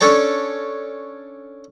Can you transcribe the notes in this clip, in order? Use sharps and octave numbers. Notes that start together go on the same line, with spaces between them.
C#4 D4 A4 C#5 A5